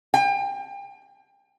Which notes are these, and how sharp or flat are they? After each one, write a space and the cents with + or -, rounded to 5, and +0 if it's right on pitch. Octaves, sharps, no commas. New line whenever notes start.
G5 +30